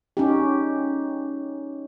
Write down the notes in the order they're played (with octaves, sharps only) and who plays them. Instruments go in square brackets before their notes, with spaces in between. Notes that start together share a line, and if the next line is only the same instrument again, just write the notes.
[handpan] C#4 D#4 G4